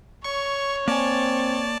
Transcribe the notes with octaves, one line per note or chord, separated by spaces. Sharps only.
C#5 C#6
A#3 C4 D5 G#5 A5